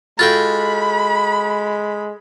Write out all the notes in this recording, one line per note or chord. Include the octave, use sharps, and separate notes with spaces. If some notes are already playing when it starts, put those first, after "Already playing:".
G#3 F4 F#4 A4 G5 B5 F6 A6